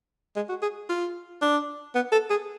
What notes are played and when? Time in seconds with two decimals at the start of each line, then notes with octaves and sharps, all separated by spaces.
0.36 G#3
0.49 F#4
0.62 G#4
0.89 F4
1.41 D4
1.95 B3
2.12 A4
2.30 G#4